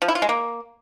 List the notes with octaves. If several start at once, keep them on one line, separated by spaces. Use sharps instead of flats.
F3
E4
F4
G#3
A#3